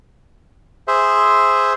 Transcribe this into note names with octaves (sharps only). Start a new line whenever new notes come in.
G#4 C5 E5